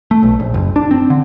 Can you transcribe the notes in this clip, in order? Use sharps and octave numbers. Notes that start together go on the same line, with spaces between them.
A3
B1
A#1
F#1
D4
C4
D3